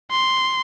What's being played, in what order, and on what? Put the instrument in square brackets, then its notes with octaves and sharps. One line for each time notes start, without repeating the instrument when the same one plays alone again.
[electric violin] C6